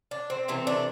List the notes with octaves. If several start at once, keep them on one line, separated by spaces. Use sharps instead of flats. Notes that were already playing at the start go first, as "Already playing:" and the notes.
D4
C4
C3 E3 A3 C4
D4